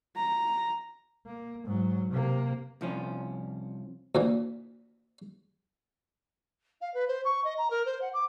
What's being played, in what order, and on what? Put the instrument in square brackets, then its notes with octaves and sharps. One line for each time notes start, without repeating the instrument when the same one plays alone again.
[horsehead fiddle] A#5
[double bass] A#3
G#2 F#3
C3 A#3
[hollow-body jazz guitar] C2 F3 C#4
[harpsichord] D2 A#2 E3
[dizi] F5
B4
C5
C#6
D#5
A#5
A#4
C5
F#5
D6